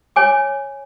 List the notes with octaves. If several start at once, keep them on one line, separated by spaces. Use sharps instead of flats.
C#5 G#5 D6